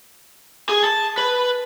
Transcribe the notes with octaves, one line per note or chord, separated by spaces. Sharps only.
G#4
A5
B4